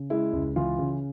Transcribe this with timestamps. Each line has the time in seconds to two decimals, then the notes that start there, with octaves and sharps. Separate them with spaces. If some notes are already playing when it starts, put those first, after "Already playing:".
Already playing: C#3
0.10 G#3 E4
0.33 C#2
0.56 E3 F4
0.78 C#3